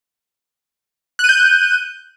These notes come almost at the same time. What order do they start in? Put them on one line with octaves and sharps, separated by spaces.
F#6 D#7 G6